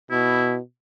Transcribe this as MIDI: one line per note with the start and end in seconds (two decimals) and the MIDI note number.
0.11 0.59 47
0.11 0.56 64